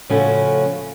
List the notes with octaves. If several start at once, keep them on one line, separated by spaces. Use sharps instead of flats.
A2 C#3 F3 A3 C#4 F#4